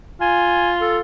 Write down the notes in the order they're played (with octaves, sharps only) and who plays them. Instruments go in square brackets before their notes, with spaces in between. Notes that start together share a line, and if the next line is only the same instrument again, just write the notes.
[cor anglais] F4 [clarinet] G#5
[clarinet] A4